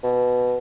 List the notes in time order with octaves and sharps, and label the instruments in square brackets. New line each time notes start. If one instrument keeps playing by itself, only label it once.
[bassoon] B2